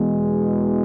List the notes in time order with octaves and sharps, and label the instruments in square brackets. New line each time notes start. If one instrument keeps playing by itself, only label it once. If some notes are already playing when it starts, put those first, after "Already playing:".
Already playing: [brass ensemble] E2 B2 G#3